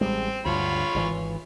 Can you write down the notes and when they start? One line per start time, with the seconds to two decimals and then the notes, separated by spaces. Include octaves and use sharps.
0.01 A1 G3 G#3 C4
0.45 D2 G2 F4 C#5 B5
0.95 G#1 C#3 E3